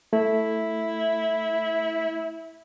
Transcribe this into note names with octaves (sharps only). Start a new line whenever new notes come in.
A3 E4